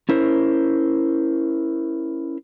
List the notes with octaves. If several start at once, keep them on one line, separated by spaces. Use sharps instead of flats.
C#4 E4 A#4 C5